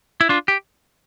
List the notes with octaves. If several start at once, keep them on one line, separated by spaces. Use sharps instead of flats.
E4
D4 F4
G4